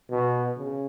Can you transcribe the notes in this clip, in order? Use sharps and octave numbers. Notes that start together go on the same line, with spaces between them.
B2
C#3